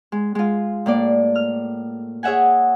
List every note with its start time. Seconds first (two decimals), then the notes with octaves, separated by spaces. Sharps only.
0.12 G#3
0.35 G#3 F4
0.86 A2 A#3 D5
1.35 F6
2.23 G#4 C#5 E5 F#5 G#5